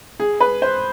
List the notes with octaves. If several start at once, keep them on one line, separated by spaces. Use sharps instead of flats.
G#4
B4
C5